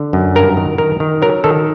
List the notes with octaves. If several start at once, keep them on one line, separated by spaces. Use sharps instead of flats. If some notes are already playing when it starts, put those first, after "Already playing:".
Already playing: D3
F#2
G2 A#4
D#3
D#3 A#4
D#3
F#3 A#4
D#3 A4